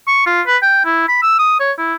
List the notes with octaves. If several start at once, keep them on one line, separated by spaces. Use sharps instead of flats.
C#6
F4
B4
G5
E4
B5
E6
D#6
C#5
E4